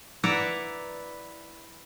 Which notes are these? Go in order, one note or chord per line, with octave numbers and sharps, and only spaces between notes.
E4 B4 D5 E5 F#5 A#5